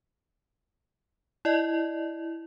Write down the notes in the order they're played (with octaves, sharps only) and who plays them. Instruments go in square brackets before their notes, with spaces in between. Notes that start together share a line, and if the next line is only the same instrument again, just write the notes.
[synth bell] E4 D5 D#5